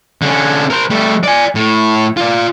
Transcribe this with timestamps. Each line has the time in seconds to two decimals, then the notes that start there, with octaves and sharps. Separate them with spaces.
0.22 D3 C#4
0.70 A#4 C5
0.90 G3 A3
1.23 D5 G#5
1.55 A2
2.17 F4 D5